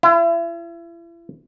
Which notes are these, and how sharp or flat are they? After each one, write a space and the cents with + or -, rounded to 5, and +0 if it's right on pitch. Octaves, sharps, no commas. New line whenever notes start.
E4 +40